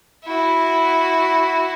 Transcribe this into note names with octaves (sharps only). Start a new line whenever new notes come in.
E4 F#4